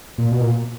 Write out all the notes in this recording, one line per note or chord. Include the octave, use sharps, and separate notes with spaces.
A#2
B2
A#2